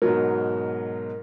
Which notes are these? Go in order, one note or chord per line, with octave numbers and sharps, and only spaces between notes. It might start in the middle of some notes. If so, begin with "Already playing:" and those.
G#2 B2 F#3 A#4